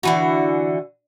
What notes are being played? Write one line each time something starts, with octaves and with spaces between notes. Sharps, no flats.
D3 E3 F#4